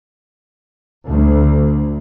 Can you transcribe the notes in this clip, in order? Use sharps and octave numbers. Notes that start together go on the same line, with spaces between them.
D2